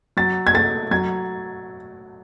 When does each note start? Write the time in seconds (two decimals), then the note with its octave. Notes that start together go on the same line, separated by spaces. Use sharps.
0.17 F#3 A6
0.47 G#6
0.54 A3 A6
0.91 F#3 G#6